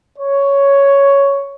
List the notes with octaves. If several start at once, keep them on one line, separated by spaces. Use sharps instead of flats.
C#5